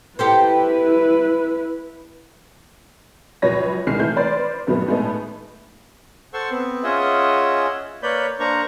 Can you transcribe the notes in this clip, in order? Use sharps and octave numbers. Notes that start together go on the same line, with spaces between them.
E4 G4 A4 B4 C5
C#2 F#2 F3 B4 C#5 A#6
C2 D#3 G#3 F6 C7
E3 A3 G6
B4 C5 D5
G2 D#3 F#3 A3 B3
A2 G#3 A3 B3 D#4 A4
A4 C5 F#5 C6 C#6 E6
B3 C4
C#4 F4 G#4 D#5 E5 F#5
A#3 B4 C#5 D5 B5 G6
A#3 D4 C5 A#5 C#6